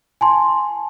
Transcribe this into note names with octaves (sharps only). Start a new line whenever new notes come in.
G#5 A5 C6